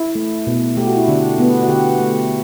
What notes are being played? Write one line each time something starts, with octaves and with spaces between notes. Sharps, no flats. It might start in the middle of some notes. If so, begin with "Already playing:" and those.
Already playing: E4
A3
B2
A3 G4
F#4
E4
D3 D4
A3 B3
F#4
D3 G4
A3